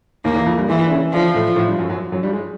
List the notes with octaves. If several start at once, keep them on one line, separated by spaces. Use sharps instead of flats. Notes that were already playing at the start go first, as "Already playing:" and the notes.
D#2 D#3 A#3
E2 E3
F2 F3
G2 G3
G#2 E3 G#3
D4
C#3 C#4
D3 F3 D4
A2 A3
A2 A3
G2 G3
F#2 F#3
F#2 F#3
F#2 F#3
G2 G3
G#3